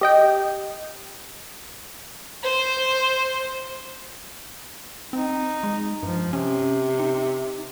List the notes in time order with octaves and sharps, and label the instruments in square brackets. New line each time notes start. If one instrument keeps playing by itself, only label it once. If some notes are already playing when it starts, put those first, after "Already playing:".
[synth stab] G4 D#5 G5
[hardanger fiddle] C5
[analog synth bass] C4 [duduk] D#4
[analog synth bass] G#3
[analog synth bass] G2 [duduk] F3
[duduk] C3 [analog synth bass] C#4
[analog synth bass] D#4